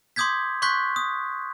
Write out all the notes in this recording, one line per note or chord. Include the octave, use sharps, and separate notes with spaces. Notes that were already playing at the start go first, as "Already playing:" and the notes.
C6 D6 D#6 G6 G#6 B6
C6 C#6 F#6 G6 B6
D#6